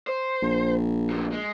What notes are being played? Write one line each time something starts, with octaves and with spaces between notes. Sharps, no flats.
C5
A#1
D2 A#2
G#3